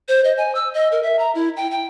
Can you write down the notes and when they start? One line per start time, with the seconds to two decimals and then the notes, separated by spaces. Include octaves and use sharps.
0.08 C5
0.24 D#5
0.38 G#5
0.55 E6
0.74 D#5
0.92 A#4
1.03 E5
1.19 A#5
1.35 E4
1.57 G5
1.71 G5